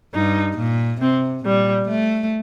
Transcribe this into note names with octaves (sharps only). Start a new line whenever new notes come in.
G2 D#4
A#2
C3 C4
A#2 G3
A3